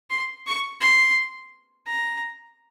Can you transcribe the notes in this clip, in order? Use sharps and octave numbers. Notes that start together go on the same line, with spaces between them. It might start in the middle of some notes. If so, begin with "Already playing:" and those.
C6
C#6
C6
A#5